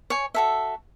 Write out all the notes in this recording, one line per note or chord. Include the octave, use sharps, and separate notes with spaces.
C#5 G#5
F#4 A4 E5